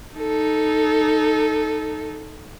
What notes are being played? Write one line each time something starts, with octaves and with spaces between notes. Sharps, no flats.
D#4 A4